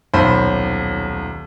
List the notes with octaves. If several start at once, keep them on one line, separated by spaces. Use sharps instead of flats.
D#1 B1 C5 B5